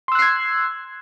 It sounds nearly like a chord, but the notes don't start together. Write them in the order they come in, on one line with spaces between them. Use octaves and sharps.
C6 E6 F#6 C7 G#6